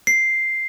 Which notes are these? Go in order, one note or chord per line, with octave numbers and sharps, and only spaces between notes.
C7